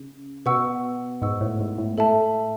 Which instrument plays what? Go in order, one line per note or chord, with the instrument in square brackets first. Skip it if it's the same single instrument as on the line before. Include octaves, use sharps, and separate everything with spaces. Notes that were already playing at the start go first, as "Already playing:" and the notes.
Already playing: [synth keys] C#3
[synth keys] B2 [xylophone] B4 F#5 C#6 E6
[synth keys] G#2 [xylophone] B4 F#5 C#6 E6
[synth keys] A2
G#2
A2
[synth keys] A2 [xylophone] A4 E5 A5